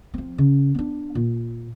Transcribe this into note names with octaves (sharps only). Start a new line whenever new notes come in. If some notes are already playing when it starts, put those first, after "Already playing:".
F3 C4
C#3
B3 D4
A#2